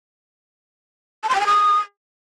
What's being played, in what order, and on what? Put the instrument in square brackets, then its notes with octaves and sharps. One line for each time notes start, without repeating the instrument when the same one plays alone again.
[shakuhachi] A5
C6
G5
G#5
D#6